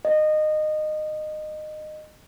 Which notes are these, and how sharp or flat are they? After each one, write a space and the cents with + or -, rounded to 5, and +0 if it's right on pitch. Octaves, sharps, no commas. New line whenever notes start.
D#5 -20